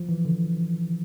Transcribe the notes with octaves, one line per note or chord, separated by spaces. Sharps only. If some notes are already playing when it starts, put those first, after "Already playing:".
Already playing: F3
E3
D3